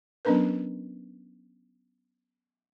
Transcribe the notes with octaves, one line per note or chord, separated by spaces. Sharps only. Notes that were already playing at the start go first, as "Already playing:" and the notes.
F#3 B3 C#4 D4 A#4 B4